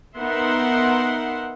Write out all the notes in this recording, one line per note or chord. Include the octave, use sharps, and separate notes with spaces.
B3 D#4 A#4 E5 F#5 C6